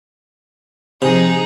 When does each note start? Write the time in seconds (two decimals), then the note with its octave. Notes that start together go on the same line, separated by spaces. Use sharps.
1.02 C3 F3 D#4 G#4